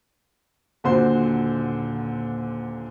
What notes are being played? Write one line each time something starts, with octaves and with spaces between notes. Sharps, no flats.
D#1 A#2 D3 F#4 C5 C6